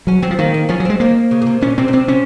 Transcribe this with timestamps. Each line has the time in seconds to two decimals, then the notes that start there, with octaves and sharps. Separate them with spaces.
0.07 F#3 C#4
0.22 F#3 C4
0.31 F3
0.39 D#3 A#3
0.54 A#3
0.69 F3 C#4
0.80 F#3
0.85 G#3 C4
1.00 D#3 A#3
1.31 C#3
1.42 A#2
1.46 C3
1.62 A#2 C#4
1.78 C3 C4
1.88 A#2
1.93 C3 C4
2.08 C3 C#4